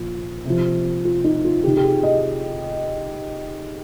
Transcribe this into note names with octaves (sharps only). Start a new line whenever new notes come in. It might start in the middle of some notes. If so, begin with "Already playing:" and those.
Already playing: A#2 F3
C3 F3
F4
D#4
F4
C3 D#3 G4
G4
G#4
D#5